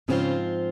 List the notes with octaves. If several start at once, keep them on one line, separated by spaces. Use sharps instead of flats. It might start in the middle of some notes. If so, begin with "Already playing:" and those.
G#2 C#3 F3 C4 C#4 F4 C5